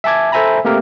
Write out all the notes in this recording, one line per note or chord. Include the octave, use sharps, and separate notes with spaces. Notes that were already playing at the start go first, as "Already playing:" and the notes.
E5 G#5 A5 D6 G#6
A4 C5 E5 G#5 A#5 B5
A3 A#3 C4 G4 A#4